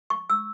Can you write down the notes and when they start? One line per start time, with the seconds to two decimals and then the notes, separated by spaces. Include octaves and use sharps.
0.10 C#6
0.30 E6